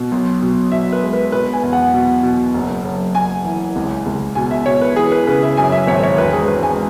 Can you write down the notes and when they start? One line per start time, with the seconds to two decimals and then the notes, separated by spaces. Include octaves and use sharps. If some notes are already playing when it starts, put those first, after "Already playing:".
Already playing: B2
0.12 B1
0.42 B2
0.72 B2 E5
0.93 B4
1.02 G#3
1.13 B4
1.32 B2 B4
1.53 G#5
1.63 E2
1.73 F#5
1.94 B2
2.23 B2
2.54 F#1
2.85 F#1
3.15 F#1 G#5
3.44 E3
3.76 C#2
4.06 C#2
4.35 B2 G#5
4.51 E5
4.66 B2 C#5
4.82 B4
4.96 E3 G#4
5.12 B4
5.27 C#3 B4
5.43 E5
5.57 F#2 G#5
5.72 E5
5.87 G#1 C#5
6.03 C#5
6.18 E1 B4
6.33 G#4
6.48 E1 B4
6.63 G#5